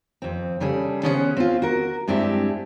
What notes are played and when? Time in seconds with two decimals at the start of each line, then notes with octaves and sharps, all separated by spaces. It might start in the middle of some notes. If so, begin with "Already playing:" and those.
0.22 F2 C4
0.60 C#3 G3 G#4 A4
1.03 B3 C#4 G#4 C5 D#5 F#5
1.37 C4 F4
1.62 F#4 A#4
2.08 G2 G#3 C4 D4 E4 G4